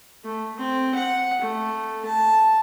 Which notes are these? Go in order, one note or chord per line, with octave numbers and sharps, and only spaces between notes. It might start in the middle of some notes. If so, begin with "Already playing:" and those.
A3
C4
F#5
A3
A5